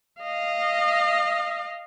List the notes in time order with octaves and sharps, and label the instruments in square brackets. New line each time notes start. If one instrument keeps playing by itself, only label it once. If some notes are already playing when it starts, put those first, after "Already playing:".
[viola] D#5 F5